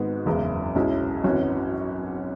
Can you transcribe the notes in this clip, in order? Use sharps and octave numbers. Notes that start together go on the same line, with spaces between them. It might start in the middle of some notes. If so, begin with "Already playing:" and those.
Already playing: G#1 G#2 G#3 B3 F#4
F#1 E2 C#3 G#3
B1 B2 G#3 C#4 E4
G#1 F#2 E3 C#4 F#4